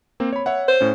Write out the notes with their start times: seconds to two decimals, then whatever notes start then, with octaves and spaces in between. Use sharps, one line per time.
0.20 A#3 C4
0.33 C#5 B5
0.46 C#5 E5 F#5
0.68 C5
0.81 A2 C#4